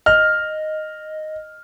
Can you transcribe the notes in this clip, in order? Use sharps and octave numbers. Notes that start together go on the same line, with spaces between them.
D#5 F6